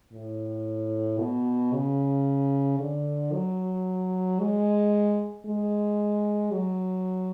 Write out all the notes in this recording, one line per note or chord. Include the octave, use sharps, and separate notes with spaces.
A2
B2
C#3
D3
F#3
G#3
G#3
F#3